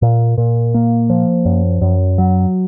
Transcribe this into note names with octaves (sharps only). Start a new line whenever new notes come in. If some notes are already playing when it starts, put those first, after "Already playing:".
A#2
A#2
A#3
F3
F#2
F#2
F#3